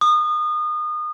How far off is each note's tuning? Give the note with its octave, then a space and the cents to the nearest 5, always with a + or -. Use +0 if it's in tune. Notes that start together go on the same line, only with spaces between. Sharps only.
D#6 -30